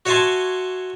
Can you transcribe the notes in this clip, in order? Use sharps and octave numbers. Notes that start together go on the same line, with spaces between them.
F#4 C#5 E5 G#5 A5 C6